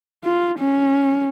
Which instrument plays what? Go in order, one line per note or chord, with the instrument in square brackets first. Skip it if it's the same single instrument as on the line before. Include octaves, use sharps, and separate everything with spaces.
[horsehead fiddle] F4
C#4